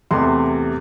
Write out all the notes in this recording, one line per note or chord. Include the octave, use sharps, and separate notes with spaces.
E2 C3 A3 C6